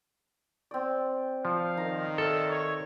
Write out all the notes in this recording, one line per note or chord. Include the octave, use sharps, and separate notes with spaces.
C4 D5
F3 F5
D#3 A#5
A4 D5 E5
C#5